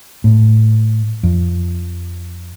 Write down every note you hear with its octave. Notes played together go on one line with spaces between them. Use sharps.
A2
F2